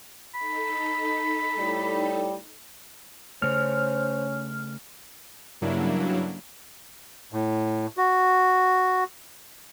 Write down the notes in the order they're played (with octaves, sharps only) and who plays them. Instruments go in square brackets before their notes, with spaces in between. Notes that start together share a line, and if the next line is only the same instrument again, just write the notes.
[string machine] D#4 A4 [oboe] B5
[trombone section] A2 G3
[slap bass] C#3 A3 [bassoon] C#4 [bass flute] C5 [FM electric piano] F6
[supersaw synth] G2 C#3 F#3 A#3 D4 E4
[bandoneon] A2
F#4